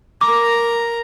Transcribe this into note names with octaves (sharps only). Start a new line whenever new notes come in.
A#4 A#5 D6